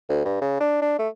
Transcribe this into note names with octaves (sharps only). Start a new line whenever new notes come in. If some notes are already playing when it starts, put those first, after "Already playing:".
D2
G2
C#3
D4
D4
A3